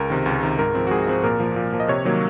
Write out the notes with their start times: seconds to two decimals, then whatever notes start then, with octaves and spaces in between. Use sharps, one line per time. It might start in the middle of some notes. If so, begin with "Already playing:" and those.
Already playing: C#2 A#4
0.10 C3 D#3
0.26 C#2
0.43 C3 D#3
0.59 G#2 A#4
0.75 F3 C4
0.87 F#4
0.91 G#2 G#4
1.07 F3 C4
1.23 A#2 A#4
1.40 F3 A#3
1.56 A#2
1.73 F3 A#3
1.80 D#5
1.88 C3 C#5
2.05 D#3 F#3 A#3